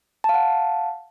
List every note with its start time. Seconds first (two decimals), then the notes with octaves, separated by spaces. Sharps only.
0.24 A5
0.29 F5
0.34 F#5